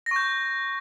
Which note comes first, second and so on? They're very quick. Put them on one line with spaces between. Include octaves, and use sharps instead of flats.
A#6 C#6 G6